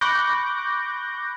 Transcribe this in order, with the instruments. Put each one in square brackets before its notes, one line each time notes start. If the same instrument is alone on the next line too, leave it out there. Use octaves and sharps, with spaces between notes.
[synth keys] B5 C#6 D6 F#6 G6 A#6